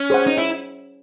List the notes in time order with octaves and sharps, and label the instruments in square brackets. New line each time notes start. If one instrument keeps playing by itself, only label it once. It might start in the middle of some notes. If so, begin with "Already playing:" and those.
Already playing: [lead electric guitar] C#4
[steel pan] G#4 C5 F#5
[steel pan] C#4 [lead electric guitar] D#4
[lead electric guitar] E4